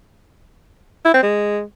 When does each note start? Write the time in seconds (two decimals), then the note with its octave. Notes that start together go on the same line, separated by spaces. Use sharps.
1.05 E4
1.14 C4
1.23 G#3